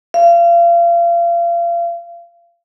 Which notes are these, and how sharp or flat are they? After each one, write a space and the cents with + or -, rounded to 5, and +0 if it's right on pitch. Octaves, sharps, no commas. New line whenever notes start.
F5 -35